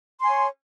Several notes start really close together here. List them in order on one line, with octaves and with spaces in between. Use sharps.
C6 G#5 C#5